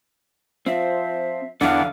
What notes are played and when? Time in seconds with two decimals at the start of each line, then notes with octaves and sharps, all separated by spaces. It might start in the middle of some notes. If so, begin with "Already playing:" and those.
0.66 F3 C4 E5
1.61 E2 D3 E3 D4 F5 F#5